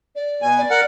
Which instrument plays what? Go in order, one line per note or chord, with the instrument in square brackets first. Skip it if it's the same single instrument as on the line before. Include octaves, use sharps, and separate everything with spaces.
[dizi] D5
[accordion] B2 G#5
[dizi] D5
[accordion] A#4 F#5